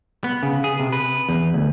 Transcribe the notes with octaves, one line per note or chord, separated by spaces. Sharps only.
B3
C#3
G#4
C3
B4
E2
D2